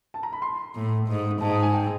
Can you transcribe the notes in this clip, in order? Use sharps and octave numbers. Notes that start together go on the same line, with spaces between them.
A5
A#5
B5
C6
A2
G#2
G#2 A5
A5
G#5
G5